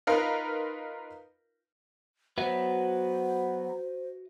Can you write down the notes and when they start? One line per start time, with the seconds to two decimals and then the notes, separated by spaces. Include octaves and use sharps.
0.07 D#4 F4 A#4 B4 F5
2.38 F#3 B3 F#4 B4 C5 E5